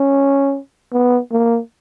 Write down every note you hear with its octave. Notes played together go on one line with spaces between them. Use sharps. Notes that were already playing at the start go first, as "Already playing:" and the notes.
Already playing: C#4
B3
A#3